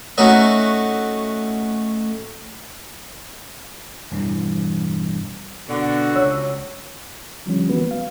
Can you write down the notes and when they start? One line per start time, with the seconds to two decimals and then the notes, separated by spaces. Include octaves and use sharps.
0.18 A3 C#4 D#4 F#4
4.11 E1 G2 E3
5.69 B2 D3 F#4
6.16 C#2 C#5 E6
7.45 D2 D3 F3 G3 C#4
7.69 E3 G#3 A#3 B3 F#4 B4
7.91 F5